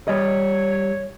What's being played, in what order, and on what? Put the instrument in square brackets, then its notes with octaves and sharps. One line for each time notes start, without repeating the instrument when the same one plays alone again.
[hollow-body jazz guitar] G3 D#5 [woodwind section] C#5